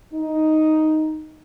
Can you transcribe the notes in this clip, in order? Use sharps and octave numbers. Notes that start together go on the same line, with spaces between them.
D#4